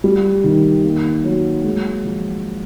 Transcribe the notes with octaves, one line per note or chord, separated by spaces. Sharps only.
G3
D#3
A#3
F#3
G#3
F3